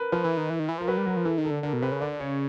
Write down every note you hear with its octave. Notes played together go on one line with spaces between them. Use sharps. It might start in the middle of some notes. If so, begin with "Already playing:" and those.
Already playing: A#4 B4
F3 B4
E3
D#3
E3
D#3
E3
F3 A#4
F#3 B4
G3
F#3 A#4
F3
E3 A4
D#3
A4
D3
D3 A#4
B2
C3 B4
C#3
D3 D5
C#3 C#5